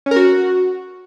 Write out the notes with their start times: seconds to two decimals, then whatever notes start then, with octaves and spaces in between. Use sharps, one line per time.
0.06 C#4
0.11 A#4
0.16 F#4